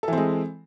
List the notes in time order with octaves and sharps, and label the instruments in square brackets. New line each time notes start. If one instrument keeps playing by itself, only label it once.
[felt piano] A4
E3
C4
G#3